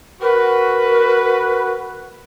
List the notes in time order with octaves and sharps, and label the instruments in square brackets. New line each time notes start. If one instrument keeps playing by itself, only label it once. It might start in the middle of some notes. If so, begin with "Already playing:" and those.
[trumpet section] F#4 B4 [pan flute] A#4